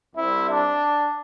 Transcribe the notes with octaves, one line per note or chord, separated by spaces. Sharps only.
C2 C3 G3 C4 E4
D4